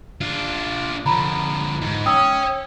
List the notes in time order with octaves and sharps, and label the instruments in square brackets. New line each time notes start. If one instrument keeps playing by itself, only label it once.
[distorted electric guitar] D4 F4
[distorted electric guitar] D3 F3 [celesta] A#5 B5
[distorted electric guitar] G#2
[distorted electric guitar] C#4 [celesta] G5 D#6 E6